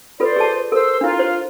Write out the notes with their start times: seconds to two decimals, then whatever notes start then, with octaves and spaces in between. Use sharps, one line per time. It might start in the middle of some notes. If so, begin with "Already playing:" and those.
0.20 F4 A4 B4 C5 D5
0.36 G#4 A4 A5
0.72 A4 A#4 C5 E6
1.01 D4 E4 F4
1.19 C5